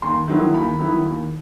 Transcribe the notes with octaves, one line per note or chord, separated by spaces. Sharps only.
D#2 C6
D#3 F#3 B3 E4
D#2 B5
D#3 F#3 B3 E4
D#2